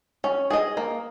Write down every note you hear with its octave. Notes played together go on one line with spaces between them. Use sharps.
C#4
G#4 D#5
A#3